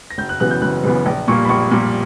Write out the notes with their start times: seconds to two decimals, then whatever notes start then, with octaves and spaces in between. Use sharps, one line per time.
0.10 A#6
0.18 F#1 G6
0.29 F#6
0.40 F#2 C#3 E3 B3 F#6
0.51 G6
0.62 F#1 F#6
0.84 F#2 C#3 E3 B3
1.06 A#1
1.28 A#2 G3 A#3 C#6
1.45 B5
1.49 A#1 C#6
1.71 A#2 G3 A#3